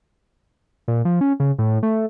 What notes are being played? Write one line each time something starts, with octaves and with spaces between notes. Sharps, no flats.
A#2
F3
C#4
C#3
A2
A3